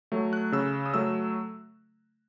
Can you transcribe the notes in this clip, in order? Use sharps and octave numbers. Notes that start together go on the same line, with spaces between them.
F#3 A3
F#6
C#3 E6
D#6
F#3 A3 E6